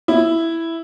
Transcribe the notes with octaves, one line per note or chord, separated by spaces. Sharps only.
E4